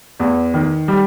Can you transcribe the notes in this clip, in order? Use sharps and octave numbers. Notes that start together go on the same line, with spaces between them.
E2
D#3
G3